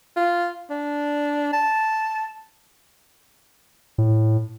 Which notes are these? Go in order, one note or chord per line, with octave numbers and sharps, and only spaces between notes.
F4
D4
A5
A2